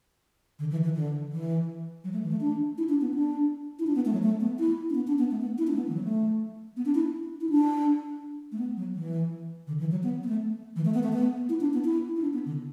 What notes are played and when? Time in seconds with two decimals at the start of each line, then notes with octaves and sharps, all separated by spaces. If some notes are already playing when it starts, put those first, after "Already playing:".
0.59 D3
0.71 E3
0.84 E3
0.96 D3
1.32 E3
2.04 F#3
2.13 A3
2.23 E3
2.31 A3
2.41 D4
2.78 E4
2.89 D4
3.01 B3
3.14 D4
3.79 E4
3.87 D4
3.95 B3
4.05 A3
4.13 F#3
4.23 A3
4.40 B3
4.59 E4
4.90 D4
4.95 B3
5.07 D4
5.19 B3
5.31 A3
5.41 B3
5.58 E4
5.67 D4
5.72 A3
5.77 B3
5.89 E3
5.95 F#3
6.04 A3
6.77 B3
6.86 D4
6.95 E4
7.41 E4
7.50 D4
8.52 A3
8.59 B3
8.77 F#3
8.95 E3
9.67 D3
9.80 E3
9.91 F#3
10.03 B3
10.23 B3
10.28 A3
10.76 E3
10.85 A3
10.94 B3
11.03 A3
11.12 B3
11.49 E4
11.61 D4
11.73 B3
11.85 E4
12.16 E4
12.22 D4
12.33 B3
12.46 D3